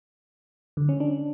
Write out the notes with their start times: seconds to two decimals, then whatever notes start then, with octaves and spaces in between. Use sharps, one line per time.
0.77 D3
0.89 C#4
1.00 D4